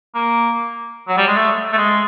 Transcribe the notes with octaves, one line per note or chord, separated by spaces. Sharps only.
A#3
F#3
G3
G#3
A3
A3
G#3